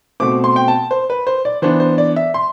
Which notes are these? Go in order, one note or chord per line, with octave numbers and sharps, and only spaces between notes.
B2 A3 C4 D6
C6
G5
A5
C5
B4
C5
D5
E3 B3 D4 C5
C5
D5
E5
C6